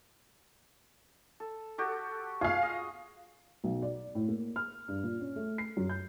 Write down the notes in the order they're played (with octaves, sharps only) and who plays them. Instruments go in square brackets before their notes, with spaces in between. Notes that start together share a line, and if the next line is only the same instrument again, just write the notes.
[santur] A4
F#4 G4 A4
[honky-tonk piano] F4 F5 [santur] G#4
[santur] D#5
[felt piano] B1
D5
A2
A#3
F6
G2
A#2
C#4
A3
C7
F#2
G6